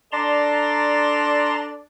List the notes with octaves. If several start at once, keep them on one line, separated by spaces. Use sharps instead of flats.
D4 A4 D5 A5 A#5 C6